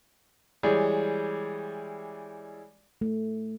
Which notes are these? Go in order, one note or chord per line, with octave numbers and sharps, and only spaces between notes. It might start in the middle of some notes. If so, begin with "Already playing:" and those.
E3 G3 G#3 G#4 C#5 D5
A3